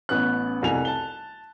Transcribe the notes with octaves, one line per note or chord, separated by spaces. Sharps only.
A1 B3 C#4 F#6
F1 C2 C3 G#5 F7
A5 G7